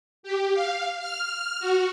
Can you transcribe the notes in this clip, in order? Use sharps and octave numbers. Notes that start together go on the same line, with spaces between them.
G4
F5
F6
F#4